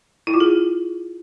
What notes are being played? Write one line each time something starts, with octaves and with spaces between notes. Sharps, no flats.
E4
F4
G#4